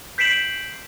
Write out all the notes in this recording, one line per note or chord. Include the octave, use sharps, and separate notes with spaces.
G6 B6 C7 D7 E7 F#7